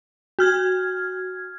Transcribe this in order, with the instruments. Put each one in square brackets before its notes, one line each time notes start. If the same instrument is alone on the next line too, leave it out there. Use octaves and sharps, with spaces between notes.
[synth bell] F#4 F6 G#6